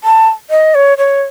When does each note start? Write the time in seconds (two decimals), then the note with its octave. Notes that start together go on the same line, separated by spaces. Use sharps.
0.04 A5
0.50 D#5
0.75 C#5
0.98 C#5